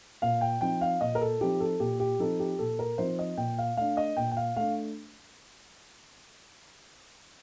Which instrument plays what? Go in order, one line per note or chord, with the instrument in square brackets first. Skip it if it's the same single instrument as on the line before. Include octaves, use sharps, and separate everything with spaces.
[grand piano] A#2 F5
G5
F3 C4 D#4 G5
F5
A#2 D#5
A#4
A4
F3 C4 D#4 G4
A4
A#2 G4
G4
F3 C4 D#4 A4
G4
A#2 A4
A#4
F3 C4 D#4 C5
D#5
A#2 G5
F5
A3 D4 F5
D#5
A#2 G5
G5
F5
A3 D4 F5